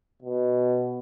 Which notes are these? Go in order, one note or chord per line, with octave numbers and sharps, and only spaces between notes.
B2